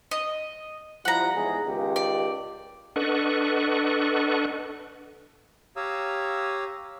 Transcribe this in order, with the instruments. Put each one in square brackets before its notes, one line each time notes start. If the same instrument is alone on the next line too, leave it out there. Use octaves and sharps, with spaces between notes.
[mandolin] D#5
[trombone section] F3 G3 E4 [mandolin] F#5 A#5
[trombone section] E2 G#2 G#4
C#2 D#3 G4
[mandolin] D5
[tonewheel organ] D4 A4 B4 D#5 F#5 C#6
[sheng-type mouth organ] G4 C#5 F5 A#5 D#6 E6